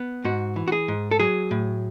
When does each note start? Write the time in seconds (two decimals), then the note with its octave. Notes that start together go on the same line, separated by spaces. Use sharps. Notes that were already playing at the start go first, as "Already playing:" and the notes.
Already playing: B3
0.25 G#2 F#4
0.56 E3
0.68 F#4
0.72 G#4
0.88 G#2
1.11 A4
1.19 F#3 G#4
1.51 A2